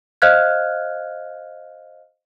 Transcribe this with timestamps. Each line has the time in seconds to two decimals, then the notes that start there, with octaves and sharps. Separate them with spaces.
0.22 C5 D#5 F5 F6 F#6 G#6